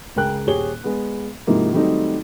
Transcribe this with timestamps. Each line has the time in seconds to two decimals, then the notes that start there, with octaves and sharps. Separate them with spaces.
0.16 C#2 C#3 A#4 G5 F#6
0.47 D#1 G4 G#4 C#5 G7
0.84 G#3 B3
1.47 G#2 C3 F3 A#3 D#4 E4
1.73 D#3 F#3 G3 A3 C4 D#4